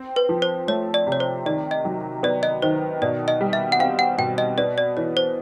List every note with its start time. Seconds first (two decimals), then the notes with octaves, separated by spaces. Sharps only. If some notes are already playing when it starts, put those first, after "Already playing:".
Already playing: C4
0.16 B4
0.29 F3
0.42 C5
0.68 A3 C#5
0.94 D5
1.07 C3
1.12 C#5
1.20 C5
1.46 D#3 D5
1.71 D#5
1.85 F#3
2.23 B3 D5
2.43 D#5
2.62 D#3 C5
3.02 B2 D5
3.28 D#5
3.41 G3
3.53 E5
3.72 F#5
3.79 C4 F5
3.99 F#5
4.18 B2 G5
4.38 D#5
4.58 B3 D5
4.78 D5
4.97 E3 C#5
5.17 C5